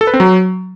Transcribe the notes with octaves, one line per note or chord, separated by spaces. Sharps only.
A4
B4
C4
F#3